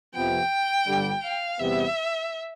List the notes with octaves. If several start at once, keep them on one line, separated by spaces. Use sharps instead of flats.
F2 C3 F3 B3 G5
G1 G2 D3 G3
F5
E2 C3 G3 B3 E5